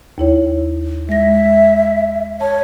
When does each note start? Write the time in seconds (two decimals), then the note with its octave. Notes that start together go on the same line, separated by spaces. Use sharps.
0.18 D#2 E4 C#5
1.09 G#3 E5 A#6
2.41 C#5 A5